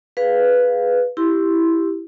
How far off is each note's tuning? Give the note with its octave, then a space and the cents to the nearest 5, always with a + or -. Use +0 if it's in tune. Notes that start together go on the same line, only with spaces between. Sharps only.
G#4 +0 B4 +0 F5 +0
E4 +0 G4 +0 C6 +0